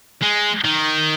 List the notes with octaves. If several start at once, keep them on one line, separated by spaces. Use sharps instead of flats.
G#3
D#3